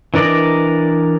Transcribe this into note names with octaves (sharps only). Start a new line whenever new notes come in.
E3 D4 A#4 D5 D#5